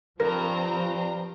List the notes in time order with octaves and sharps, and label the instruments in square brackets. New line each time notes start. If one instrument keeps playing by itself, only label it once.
[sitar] G2 [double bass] F3 [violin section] C4 A#5 [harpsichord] A#4